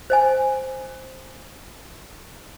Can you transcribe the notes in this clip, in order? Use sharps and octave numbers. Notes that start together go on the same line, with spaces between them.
C5 D#5 G#5